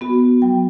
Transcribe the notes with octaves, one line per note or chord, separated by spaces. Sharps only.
B3 F#4
F#3 G5